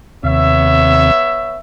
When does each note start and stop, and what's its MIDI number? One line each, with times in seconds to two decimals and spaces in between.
0.23 1.11 39
0.23 1.11 48
0.23 1.57 59
0.23 1.57 73
0.23 1.57 76